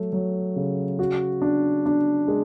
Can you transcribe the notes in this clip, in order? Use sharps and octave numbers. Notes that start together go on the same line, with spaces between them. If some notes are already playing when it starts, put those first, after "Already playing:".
Already playing: F#3 A3
F#3
C#3
F#4
D4
D4
G#3